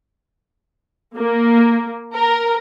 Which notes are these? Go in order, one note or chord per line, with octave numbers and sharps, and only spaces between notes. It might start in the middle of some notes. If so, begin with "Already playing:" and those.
A#3
A#4